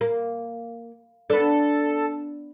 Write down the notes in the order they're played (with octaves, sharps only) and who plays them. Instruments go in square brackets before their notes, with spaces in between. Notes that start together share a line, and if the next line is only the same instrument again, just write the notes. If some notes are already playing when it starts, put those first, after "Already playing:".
[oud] A#3
[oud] B3 D4 [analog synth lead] A4